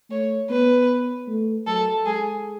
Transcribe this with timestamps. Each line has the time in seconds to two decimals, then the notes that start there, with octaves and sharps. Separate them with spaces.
0.10 A3 C#5
0.50 B3 B4
1.28 A3
1.66 F#3 A4
2.06 G#3 G#4